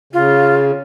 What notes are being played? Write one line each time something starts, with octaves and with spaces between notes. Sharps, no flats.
C#3 F4